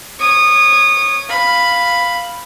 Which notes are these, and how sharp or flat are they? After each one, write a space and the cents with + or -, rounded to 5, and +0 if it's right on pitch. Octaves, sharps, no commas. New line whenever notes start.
C#5 +0 D#6 -25
F5 +0 B5 +0